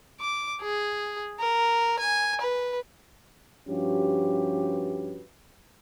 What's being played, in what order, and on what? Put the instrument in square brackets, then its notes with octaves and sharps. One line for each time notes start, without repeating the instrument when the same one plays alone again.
[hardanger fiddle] D6
G#4
A#4
G#5
B4
[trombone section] G2 F3 C#4 F#4 G4 B4